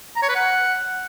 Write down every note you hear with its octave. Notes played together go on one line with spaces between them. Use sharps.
A#5
C#5
B4
F#5